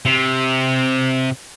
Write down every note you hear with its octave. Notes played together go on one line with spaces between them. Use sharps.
C3